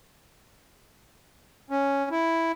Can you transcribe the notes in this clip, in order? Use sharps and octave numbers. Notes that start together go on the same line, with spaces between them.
C#4
E4